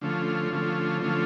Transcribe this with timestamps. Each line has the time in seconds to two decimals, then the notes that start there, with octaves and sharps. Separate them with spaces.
0.01 D3 F3 A3 C#4 F4
0.51 D3 F3 A3 C#4 F4
1.01 D3 F3 A3 C#4 F4